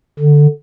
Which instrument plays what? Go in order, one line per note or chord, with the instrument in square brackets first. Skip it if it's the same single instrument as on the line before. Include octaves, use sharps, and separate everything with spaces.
[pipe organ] D3